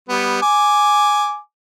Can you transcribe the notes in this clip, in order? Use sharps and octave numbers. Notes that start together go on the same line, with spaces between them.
G3 B3
G#5 D6